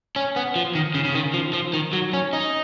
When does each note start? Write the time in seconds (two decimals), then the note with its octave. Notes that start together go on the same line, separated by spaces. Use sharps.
0.16 C#4
0.36 B3
0.56 F3
0.75 D#3
0.94 C#3
1.05 C#3
1.15 D#3
1.34 F3
1.53 F3
1.74 D#3
1.93 F#3
2.13 C#4
2.33 D#4